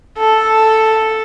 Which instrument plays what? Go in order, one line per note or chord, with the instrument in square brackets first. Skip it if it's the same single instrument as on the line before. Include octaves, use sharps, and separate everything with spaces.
[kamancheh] A4